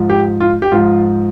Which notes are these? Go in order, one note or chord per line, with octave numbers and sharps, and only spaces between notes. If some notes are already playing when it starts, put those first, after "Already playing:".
Already playing: G#2 F3
G4
F4
G4
G#2 F3 F4